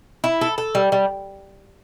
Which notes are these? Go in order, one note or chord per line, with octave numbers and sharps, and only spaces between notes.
E4
A4
A4
G3
G3